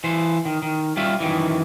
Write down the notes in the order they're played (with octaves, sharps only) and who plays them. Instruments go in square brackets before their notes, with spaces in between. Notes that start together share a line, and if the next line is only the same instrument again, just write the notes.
[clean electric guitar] E3 C5
D#3
D#3
G3 C#4 F4 E5
F#2 D#3 E3